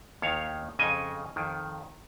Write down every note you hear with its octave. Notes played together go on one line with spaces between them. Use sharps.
D#2 D#3 C#5 F5
F2 C#3 D#5 G#5
F2 D#3